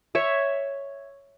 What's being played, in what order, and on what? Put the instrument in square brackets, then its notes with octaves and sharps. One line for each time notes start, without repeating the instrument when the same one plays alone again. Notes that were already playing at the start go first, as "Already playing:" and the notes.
[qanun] C#5 E5